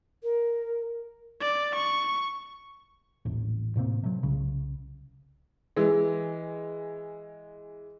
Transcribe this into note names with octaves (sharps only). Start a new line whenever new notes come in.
A#4
D5
C#6
D#1 A1
A2 C3 A#3 C4
C3 F#3
C2 C#3
E3 G#3